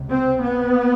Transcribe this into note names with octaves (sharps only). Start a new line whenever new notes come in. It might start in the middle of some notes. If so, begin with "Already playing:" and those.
Already playing: C#2 C3
C4
B3